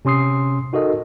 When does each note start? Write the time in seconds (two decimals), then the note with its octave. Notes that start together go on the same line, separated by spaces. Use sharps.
0.05 C3 C#4 C6 D#6 C7
0.73 D#4 F#4 A4 A#4 D#5